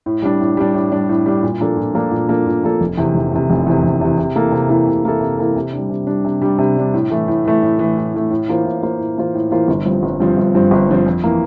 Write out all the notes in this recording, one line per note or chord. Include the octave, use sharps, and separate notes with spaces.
A2
G3 D4
A2
G3 D4
A2
G3 D4
A2
G3 D4
A#2
F3 A#3 D4 A4
A#2
F3 A#3 D4 A4
A#2
F3 A#3 D4 A4
A#2
F3 A#3 D4 A4
F1
E2 C3
F1
E2 C3
F1
E2 C3
F1
E2 C3
C3
E3 A#3 E4 A4
C3
E3 A#3 E4 A4
C3
E3 A#3 E4 A4
C3
E3 A#3 E4 A4
C3
G3 D4
C3
G3 D4
C3
G3 D4
C3
G3 D4
A2
E3 A3
A2
E3 A3
A2
E3 A3
A2
E3 A3
A2
E3 A#3 F4 C5
A2
E3 A#3 F4 C5
A2
E3 A#3 F4 C5
A2
E3 A#3 F4 C5
G1
G2 F3 C4
G1
G2 F3 C4
G1
G2 F3 C4
G1
G2 F3 C4
F2
E3 A#3